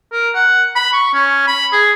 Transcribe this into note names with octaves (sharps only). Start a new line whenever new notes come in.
A#4
F#5
B5
C#6
C#4
B5
G#4